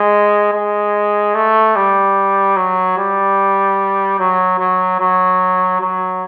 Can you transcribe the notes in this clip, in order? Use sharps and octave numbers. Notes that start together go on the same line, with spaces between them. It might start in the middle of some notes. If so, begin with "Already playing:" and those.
Already playing: G#3
G#3
A3
G3
F#3
G3
F#3
F#3
F#3
F#3